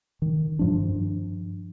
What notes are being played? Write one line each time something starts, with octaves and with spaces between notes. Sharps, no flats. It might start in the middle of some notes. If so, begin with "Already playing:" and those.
D#3
G2 F3 D4